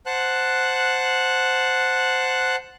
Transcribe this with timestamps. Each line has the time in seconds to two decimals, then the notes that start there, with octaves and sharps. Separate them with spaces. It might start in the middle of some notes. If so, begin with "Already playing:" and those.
0.06 C5 F#5 A5 F#6